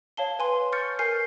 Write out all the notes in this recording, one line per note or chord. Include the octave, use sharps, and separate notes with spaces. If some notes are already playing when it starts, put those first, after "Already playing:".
C#5 F5 A5 G7
B4 G#5 C6
C#6 F6 G6 A6 C#7
A#4 G#5 F6 G6 C7